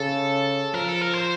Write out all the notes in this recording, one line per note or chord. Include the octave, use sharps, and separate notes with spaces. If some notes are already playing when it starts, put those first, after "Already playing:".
Already playing: C#3 A4
F3 A#4
A4
A#4
C5